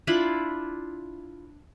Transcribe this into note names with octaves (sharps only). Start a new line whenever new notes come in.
D4 E4 F4 B5